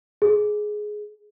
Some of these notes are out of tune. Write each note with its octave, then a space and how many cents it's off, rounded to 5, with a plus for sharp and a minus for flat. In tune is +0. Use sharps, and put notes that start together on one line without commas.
G#4 +15